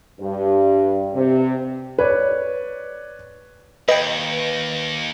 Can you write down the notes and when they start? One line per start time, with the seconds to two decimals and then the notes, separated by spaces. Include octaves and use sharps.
0.19 G2
1.14 C3
1.98 B4 C#5 D5
3.88 D#2 B4 D#5 G5